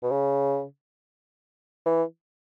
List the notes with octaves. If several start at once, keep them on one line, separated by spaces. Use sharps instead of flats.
B2
C#3
E3